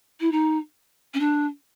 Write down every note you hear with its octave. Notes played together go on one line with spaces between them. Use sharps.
E4
D#4
C#4
D4